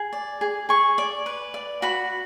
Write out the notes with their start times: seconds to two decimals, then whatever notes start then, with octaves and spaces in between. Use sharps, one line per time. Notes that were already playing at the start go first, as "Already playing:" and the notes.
Already playing: G#4
0.13 D5
0.41 G#4
0.69 G#4 C#6
0.98 D5
1.26 B4
1.54 D5
1.82 F#4 B5